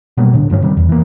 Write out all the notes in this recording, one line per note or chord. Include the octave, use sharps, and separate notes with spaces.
B2 F#3 G3 A#3
A2 D3
A1 G2 F3 C#4
C3 D#3 G3
E2
E3 A#3